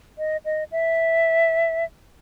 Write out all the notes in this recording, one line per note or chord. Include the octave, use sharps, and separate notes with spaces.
D#5
D#5
E5